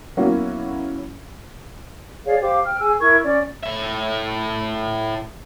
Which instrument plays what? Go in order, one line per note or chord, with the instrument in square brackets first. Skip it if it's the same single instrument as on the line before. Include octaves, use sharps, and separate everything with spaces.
[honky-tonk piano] F#3 A#3 B3 C#4 E4 F#4
[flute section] G#4 C#5 D5 F5
G4 C5 F5 D6
G5 F6
G#4 G#5 E6
E4 A#4 C#6 G#6
C#4 D5
[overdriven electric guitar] A2 E5